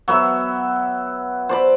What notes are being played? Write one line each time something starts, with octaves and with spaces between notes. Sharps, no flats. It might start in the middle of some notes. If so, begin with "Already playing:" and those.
F#3 B3 E5
C5 D5 B5